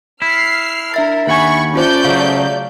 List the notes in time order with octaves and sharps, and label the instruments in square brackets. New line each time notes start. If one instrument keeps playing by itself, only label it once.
[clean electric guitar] E4 [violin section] F6 C7
[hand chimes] D4 E5 A6 [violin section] A#4
[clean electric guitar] D#2 F#5 G#5 [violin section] B5 C#6
[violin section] A3 D5 G6 [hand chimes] C#4 F4 C5
[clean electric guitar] C#3 F#3 [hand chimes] F5